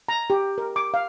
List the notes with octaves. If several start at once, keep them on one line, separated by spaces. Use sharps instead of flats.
A#5
G4
A#4
D6
F5